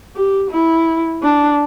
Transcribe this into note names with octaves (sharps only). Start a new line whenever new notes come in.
G4
E4
D4